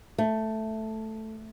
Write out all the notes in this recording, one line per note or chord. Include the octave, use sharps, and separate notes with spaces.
A3